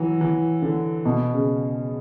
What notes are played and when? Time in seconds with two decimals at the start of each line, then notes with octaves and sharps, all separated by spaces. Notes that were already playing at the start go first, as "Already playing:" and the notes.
Already playing: E3 F#3
0.21 E3
0.62 D3
1.05 B2
1.33 C#3